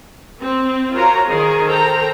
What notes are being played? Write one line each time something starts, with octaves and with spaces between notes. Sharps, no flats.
C4
F4 F#4 A#4 C5 C#5 A#5
D#3 G#4 A#4
A4 A#4 C5 G5 A#5